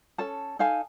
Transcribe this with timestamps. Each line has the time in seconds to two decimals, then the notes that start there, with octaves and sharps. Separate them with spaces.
0.18 C#4 A4 A5
0.59 D#4 A4 F5 G#5